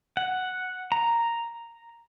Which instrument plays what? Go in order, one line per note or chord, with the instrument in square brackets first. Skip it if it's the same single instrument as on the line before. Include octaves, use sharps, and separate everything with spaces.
[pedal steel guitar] F#5
A#5